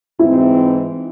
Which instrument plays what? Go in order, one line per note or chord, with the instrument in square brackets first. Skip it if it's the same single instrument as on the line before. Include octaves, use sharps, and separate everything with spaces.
[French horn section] G#2 E3 C4 [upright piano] E4